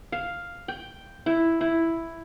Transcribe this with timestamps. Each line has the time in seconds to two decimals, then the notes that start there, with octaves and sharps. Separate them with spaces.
0.12 F5
0.68 G5
1.26 E4
1.61 E4